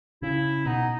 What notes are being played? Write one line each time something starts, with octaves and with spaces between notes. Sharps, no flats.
C#3 E4
B2 D#4